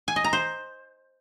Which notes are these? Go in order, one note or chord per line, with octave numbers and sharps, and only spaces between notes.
G#5
D#5
A#5
C5